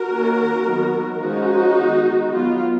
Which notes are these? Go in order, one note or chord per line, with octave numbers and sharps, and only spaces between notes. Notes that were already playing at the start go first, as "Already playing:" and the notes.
Already playing: F#4 A#4
D#3 A#3 C#4
D#3 F#3 B3
F3 G#3 C#4 D#4 F#4
D#3 G#3 B3
F#3 B3 F4